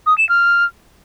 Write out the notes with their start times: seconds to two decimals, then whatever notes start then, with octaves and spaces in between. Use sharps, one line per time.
0.06 D#6
0.18 E7
0.29 F6